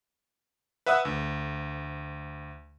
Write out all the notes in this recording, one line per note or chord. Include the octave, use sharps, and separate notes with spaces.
B4 E5 F#5 D#6 E6
D2